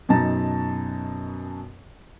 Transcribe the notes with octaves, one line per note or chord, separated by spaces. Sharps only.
F#2 B2 D#4 A5 A#5 A6